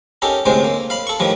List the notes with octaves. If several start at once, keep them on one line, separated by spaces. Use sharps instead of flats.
C#4 D#4 G4 A4 A#4
D2 A2 C3 G#3 C5
A#3
F5 B5
A4 C#6
A2 D#3 F3 G3